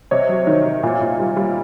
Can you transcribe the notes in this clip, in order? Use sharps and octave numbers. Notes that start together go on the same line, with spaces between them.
C3 C#5 D#5
F#3
D#3
C3
A#2
A#2
G3
G3